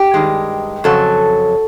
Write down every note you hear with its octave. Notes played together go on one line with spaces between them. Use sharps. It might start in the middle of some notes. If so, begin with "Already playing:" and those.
Already playing: G4
G2 D#3 G#3
F2 C#3 F#3 A4